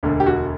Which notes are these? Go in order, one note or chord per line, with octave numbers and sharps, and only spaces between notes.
E1 D2 D3
G4
F#4